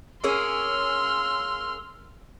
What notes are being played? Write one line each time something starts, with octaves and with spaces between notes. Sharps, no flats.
A#3 C#4 G#4 C6 E6 F6